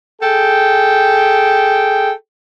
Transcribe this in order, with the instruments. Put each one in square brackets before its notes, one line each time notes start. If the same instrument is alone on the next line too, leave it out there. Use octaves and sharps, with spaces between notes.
[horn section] G#4 A4 G5